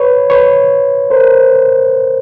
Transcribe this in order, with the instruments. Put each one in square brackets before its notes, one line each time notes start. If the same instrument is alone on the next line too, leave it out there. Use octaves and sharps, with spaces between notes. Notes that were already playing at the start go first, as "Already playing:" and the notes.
Already playing: [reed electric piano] B4 C#5
B4 C#5
A#4 C5